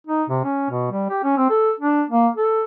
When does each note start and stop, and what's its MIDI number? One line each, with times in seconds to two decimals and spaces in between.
0.07 0.23 63
0.29 0.40 48
0.44 0.66 61
0.70 0.88 47
0.92 1.08 55
1.10 1.22 67
1.24 1.34 61
1.37 1.49 60
1.50 1.72 69
1.80 2.03 62
2.09 2.28 58
2.37 2.64 69